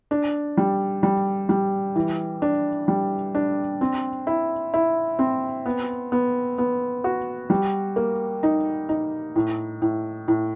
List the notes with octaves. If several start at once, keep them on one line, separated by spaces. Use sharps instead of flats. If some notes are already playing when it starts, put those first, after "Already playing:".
D4
G3
G3
G3
E3
D4
G3
D4
C4
E4
E4
C4
B3
B3
B3
F#4
G3
A#3
D#4
D#4
A2
A2
A2